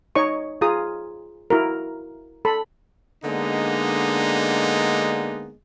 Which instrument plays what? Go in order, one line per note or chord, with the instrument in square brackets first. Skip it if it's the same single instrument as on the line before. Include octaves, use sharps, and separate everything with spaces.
[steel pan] D#4 C#5 D#5 C#6
F4 G#4 A#5 D#6
E4 F#4 A#4
A4 B5
[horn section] D3 G#3 A#3 B3 D4 D#4